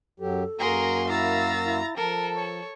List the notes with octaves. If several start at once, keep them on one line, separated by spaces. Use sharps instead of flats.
F#2 F#3 G4 A4
F#2 A#3 F#4 G#4 A#4 A#5 C6
E4 F5 A#5 E6 A6
E4
F3 A4 A#4 A5
C#5